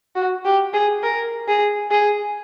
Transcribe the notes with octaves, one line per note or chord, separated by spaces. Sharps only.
F#4
G4
G#4
A#4
G#4
G#4